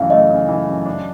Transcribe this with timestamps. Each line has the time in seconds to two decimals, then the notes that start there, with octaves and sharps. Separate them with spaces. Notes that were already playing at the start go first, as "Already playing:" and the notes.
Already playing: F#2 C#3 E3 A3 F5
0.10 A3 D#5
0.30 C#3
0.49 E3
0.67 F#2
0.86 D4